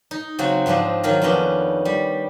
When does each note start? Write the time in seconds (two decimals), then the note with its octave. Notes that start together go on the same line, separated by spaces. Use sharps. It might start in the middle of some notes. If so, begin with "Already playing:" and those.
0.11 D#4
0.39 C#3 F#3 C4 F#4
0.66 G#2 F3 C4 D4 D#5
1.03 D#3 F#3 F5 A#5
1.21 F2 D#3 B3 C#4 D4
1.85 G3